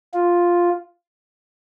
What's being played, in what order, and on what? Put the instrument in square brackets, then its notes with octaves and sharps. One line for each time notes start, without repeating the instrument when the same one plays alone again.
[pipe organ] F4